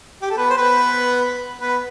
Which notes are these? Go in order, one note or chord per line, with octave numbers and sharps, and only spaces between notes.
G4
A4
B3 B4
C5
B3 B4
B3 B4